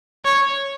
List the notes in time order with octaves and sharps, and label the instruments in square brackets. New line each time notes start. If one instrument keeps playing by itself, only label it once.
[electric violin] C#5